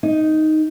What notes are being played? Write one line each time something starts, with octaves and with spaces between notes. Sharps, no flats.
D#4